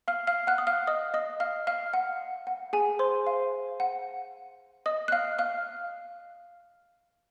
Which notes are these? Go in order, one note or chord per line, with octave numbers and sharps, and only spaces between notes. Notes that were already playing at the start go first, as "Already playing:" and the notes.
F5 F6
F5 F6
F#5 F#6
D#6
F5 F6
D#5 D#6
D#5 D#6
F5 F6
F5 F6
F#5
F#5
G#4 G#5
C5 C6
F5
F#5
D#5 D#6
F#6
F5 F6
F5 F6